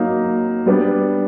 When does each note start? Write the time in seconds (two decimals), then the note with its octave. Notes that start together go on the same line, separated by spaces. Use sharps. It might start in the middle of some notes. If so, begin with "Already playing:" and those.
Already playing: F#3 A#3 D#4
0.66 G3 B3 D4